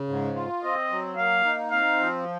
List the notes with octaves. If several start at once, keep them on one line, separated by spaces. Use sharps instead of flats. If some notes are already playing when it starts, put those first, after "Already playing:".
Already playing: C#3
G#2
F4
C4 D#5
F#3
A#3 F5
D#4
C4 F5
F3